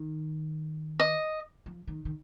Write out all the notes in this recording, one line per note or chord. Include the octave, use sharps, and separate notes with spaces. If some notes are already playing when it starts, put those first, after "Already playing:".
Already playing: D#3
D#5
F3
D#3
D#3